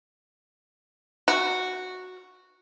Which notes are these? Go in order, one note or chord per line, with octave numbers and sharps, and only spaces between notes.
F#4